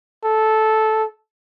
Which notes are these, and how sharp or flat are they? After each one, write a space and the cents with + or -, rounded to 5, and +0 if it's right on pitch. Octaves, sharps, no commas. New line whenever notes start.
A4 -10